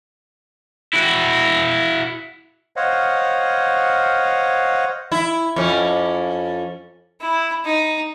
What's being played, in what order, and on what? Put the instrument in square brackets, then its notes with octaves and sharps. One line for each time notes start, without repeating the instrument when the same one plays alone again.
[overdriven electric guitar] E4 F#4
[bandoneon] C5 C#5 D#5 F5 F#5
[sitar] E4
F2 C#4
[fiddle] E4
D#4